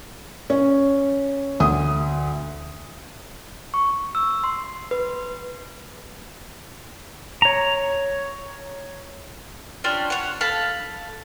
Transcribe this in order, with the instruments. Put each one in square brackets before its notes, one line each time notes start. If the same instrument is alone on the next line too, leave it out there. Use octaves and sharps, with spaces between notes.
[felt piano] C#4
D2 D#6
[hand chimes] C#6
E6
C6
B4
[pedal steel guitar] C#5 A#5
[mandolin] C#4 D4 F4 G4
C#5 F#5
A4 F5 A5 B5